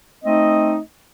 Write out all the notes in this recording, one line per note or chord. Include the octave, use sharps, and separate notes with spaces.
A3 C4 D#4 D#5